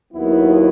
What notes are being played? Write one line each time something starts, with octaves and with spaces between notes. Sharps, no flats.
D#2 D#3 F#3 B3 E4